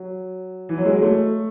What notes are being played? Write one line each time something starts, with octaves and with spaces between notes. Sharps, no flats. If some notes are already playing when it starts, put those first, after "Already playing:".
Already playing: F#3
E3
F#3
G#3
F#3
A3